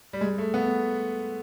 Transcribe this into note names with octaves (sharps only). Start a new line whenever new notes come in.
G3
G#3
A3
B3